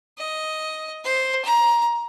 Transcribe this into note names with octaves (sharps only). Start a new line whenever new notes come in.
D#5
C5
A#5